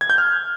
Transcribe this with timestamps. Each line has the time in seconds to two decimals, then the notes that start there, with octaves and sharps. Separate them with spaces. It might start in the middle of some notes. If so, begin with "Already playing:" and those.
0.01 G#6
0.10 G6
0.18 F6